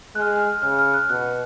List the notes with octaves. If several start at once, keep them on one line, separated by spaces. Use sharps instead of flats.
G#3 F#6
F6
F#6
F6
C#3 F6
F6
F#6
B2 F#6